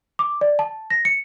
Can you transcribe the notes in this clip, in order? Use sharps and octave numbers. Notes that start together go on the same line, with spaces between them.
D6
D5
A5
A#6
C#7